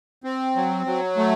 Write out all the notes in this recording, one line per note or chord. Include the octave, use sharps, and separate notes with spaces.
C4
F#3
F#3
A3